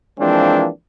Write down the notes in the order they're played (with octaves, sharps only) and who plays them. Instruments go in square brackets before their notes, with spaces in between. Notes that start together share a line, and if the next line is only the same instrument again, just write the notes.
[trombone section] E3 F3 G#3 A#3 C4 D4